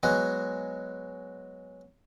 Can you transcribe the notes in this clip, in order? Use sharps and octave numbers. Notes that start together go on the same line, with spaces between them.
F#3 G#3 B3 F#4